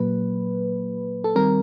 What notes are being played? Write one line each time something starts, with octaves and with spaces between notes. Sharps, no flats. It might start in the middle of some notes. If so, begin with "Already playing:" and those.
Already playing: A#2 F#3 A#3 B4
A4
D#3 G3 C4 A#4